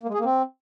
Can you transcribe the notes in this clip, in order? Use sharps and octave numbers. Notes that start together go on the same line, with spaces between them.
A#3
G#3
G#4
A#3
C4